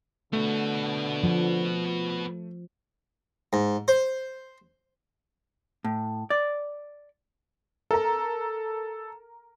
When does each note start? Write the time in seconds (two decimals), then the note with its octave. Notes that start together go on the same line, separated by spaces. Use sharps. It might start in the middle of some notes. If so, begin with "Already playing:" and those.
0.33 D3 A3 B3 F#4
1.24 F3
3.53 G#2
3.88 C5
5.84 A2
6.30 D5
7.91 A4 A#4 A#5